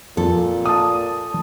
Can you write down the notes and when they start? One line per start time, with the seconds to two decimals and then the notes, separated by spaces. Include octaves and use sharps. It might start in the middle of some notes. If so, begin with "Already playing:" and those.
0.17 F2 A#2 A4
0.66 A5 D#6